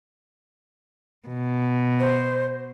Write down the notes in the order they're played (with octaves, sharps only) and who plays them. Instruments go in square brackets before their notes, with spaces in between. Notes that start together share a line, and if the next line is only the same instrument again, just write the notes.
[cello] B2
[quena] C5